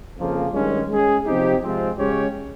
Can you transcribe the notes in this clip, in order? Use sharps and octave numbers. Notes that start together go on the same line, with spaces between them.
F2 C#3 F3 A#3
G2 D#3 G#3 C#4
G#3 C#4 G#4
C3 F3 C4 D#4 G4
C3 F3 G#3 C4 F4
C#3 G#3 C#4 G4 C#5